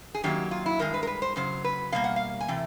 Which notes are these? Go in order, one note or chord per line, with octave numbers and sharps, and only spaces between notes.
G#4
F#2 D#3 F#3 A#3 G4
F4
E4
G2 D#3 G#3 A#4
B4
A#4
B4
C5
F#2 C#3 F#3 C5
B4
B2 G3 A#3 F5
F#5
F5
G#5
C3 E3 A3 G5